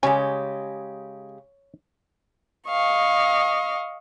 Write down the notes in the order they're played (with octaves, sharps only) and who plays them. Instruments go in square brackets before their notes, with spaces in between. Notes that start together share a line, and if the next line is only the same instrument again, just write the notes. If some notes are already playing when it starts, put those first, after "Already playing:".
[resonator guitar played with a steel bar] C#3 G#3 G4 [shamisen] G3 C#4 G#5 [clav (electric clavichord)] C#5
[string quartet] D#5 F5 C#6